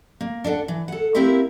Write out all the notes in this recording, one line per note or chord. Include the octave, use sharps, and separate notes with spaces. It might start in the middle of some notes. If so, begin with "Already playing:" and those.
A#3
D4 A4 E5 F#5
E3
A4 F#5
A#3 C4 E4 G4 A#4 E5